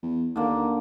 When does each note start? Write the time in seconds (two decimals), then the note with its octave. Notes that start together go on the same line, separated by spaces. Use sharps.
0.03 E2
0.36 D#2 D3 A#3